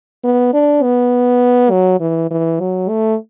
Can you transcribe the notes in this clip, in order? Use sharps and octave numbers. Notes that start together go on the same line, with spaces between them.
B3
D4
B3
F#3
E3
E3
F#3
A3